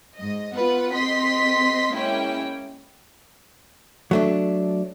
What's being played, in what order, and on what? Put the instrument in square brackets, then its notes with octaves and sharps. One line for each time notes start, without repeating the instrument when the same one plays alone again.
[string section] G#2 D#5
B3 F4 B4 F#5
C4 D#5 C6 B6
G#3 A#3 C#4 E4 G5
[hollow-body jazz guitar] F#3 A3 D4